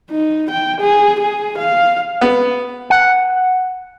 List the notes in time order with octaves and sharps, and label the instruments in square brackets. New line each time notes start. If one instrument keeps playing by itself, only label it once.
[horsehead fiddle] D#4
G5
G#4
G#4
F5
[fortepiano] B3
[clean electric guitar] F#5